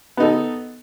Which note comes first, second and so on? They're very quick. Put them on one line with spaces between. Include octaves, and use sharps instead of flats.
B3 D#4 A4